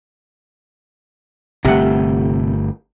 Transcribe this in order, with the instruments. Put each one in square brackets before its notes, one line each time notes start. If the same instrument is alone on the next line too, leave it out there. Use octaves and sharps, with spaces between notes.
[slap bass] G1 A3 [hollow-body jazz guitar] C3 F#5